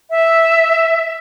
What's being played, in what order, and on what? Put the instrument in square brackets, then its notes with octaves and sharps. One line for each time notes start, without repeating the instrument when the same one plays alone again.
[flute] E5